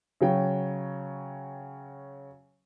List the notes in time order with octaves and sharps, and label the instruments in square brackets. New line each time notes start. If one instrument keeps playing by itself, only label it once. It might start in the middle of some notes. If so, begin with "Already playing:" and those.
[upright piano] C#3 F#3 G5